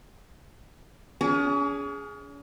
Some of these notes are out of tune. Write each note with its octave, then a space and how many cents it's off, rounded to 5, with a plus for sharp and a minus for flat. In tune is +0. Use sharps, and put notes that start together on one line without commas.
C#4 +40 G#4 +0